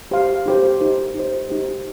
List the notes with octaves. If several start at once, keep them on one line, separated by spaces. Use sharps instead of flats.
G4 C5 F5 C6
D#4 G4 C5
D#4 G4 C5
D#4 G4 C5
D#4 G4 C5